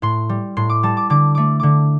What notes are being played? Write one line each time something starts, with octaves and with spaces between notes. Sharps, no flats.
A2 C6
G3
A2 C6
D6
G3 A5
D6
D3 D6
A3 D6
D3 D6